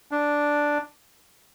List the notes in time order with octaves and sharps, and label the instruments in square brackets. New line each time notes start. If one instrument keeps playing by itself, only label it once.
[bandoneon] D4